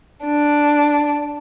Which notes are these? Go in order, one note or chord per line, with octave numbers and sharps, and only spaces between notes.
D4